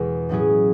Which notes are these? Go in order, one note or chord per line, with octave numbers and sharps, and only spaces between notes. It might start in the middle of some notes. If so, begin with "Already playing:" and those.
Already playing: E2 B2 E3 G#3
A2 F#3 C#4 E4 G#4